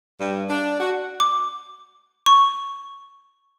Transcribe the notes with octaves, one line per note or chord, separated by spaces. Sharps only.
G2
D4
F#4
D6
C#6